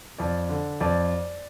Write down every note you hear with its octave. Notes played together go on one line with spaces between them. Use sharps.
F2 D5
D3
F2 D5